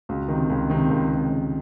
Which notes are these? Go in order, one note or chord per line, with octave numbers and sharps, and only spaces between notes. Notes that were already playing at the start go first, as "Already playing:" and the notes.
C#2 F#4
C3 D#3
C#2
C3 D#3
C#2
C3 D#3
C#2